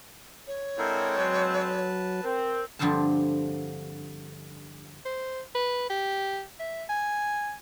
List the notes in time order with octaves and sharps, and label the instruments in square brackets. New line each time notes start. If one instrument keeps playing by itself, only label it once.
[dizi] C#5
[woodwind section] D3 G#3 C4 [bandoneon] E4 A4 A#4
[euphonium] F#3 [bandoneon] B4 A5
[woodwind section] C4 [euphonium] A#4
[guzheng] G2 D3 F3 C4 F4 A5
[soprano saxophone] C5
B4
G4
E5
G#5